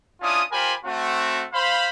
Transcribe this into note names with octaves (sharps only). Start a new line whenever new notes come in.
C#4 D4 E4 F4 D#6
F4 G4 A#4 C5 G#5 B5
A3 C4 F#4
C5 F5 B5